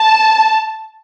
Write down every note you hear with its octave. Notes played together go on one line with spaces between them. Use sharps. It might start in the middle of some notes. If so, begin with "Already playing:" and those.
Already playing: A5